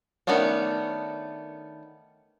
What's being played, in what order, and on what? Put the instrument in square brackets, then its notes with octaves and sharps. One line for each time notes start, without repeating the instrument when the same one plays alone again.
[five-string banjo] D#3 A3 B3 C#4 D4